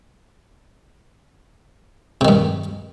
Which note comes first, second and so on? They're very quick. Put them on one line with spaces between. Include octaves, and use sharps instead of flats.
C3 D#3 G2